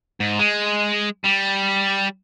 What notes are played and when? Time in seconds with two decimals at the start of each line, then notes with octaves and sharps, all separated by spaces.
0.20 G#2
0.39 G#3
1.25 G3